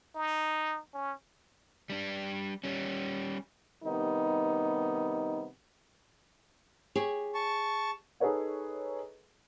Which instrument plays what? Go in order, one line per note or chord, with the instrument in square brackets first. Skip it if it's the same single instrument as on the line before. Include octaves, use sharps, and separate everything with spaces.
[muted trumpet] D#4
C#4
[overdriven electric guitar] G3 D4
G3 C#4
[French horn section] C3 D#3 G3 B3 D#4
[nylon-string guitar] G4 G#4 C#5
[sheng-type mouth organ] A5 C#6
[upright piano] D#4 G#4 A4 B4 C#5 D#5